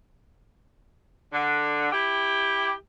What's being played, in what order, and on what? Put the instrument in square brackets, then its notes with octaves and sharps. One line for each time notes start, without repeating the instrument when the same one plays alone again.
[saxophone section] D3
E4 G4